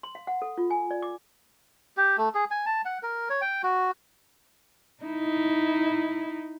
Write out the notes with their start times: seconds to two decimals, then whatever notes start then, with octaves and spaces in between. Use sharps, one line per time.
0.03 C6
0.15 F5
0.27 F#5
0.42 A4
0.58 F4
0.70 G#5
0.91 D5
1.02 D6
1.97 G4
2.18 A3
2.34 G#4
2.51 G#5
2.66 A5
2.85 F#5
3.03 A#4
3.30 C#5
3.41 G5
3.63 F#4
5.03 D#4 E4